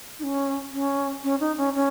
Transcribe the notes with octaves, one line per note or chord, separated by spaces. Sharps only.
D#4
C#4
C#4
C#4
D#4
C#4
C#4